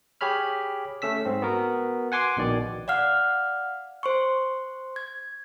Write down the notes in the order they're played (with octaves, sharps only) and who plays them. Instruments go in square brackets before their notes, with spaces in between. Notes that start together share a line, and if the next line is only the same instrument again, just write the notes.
[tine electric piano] G4 G#4 C#5 B5 F6
A3 C#4 E6 B6
G#2 C4
B3 F#4 A#4
F#5 G#5 C6 D6
A#1 B2 D#3 D5
[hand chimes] D5 F5 F#5 F6
C5 C6 C#6
G#6